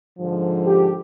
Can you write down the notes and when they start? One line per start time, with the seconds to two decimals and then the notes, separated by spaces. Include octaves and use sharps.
0.19 G#2 D3 F3
0.65 G4